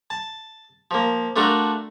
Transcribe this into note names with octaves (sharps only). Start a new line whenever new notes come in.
A5
F3 A#3
A3 D4 F4 F#4 A#4